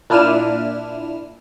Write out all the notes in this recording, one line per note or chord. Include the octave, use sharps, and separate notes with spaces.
A#2 D4 E4 F6 D#7 E7